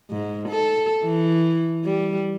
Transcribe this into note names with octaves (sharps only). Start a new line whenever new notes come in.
G#2
A4
E3
G3